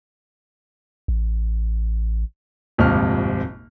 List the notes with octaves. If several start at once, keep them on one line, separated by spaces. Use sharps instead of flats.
A1
D#1 G#1 F2 C3 F6